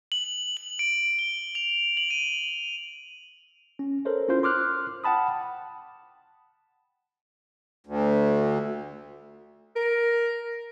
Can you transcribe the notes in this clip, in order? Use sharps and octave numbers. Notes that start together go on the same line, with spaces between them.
F#7
F#7
D7
G7
F7
F#7
D#7
C#4
A4 A#4 C5 C#5
C#4 E4 F4 C5
C6 D6 F6 F#6
F#5 G5 A5 B5 D#6
D2
A#4